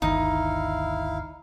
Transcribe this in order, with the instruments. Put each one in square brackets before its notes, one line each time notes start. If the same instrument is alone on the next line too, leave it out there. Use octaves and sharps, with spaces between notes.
[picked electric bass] G1 D2 D#3 [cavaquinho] D#4 [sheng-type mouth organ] E4 F5